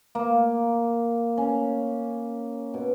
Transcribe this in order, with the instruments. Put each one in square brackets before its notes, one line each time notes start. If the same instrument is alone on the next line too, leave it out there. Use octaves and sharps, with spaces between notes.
[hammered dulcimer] A#3
C#4
B2